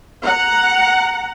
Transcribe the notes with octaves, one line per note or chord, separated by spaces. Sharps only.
F#5 A#5